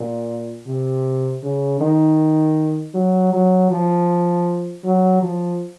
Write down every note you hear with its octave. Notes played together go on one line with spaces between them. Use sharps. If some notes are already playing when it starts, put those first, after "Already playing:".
Already playing: A#2
C3
C#3
D#3
F#3
F#3
F3
F#3
F3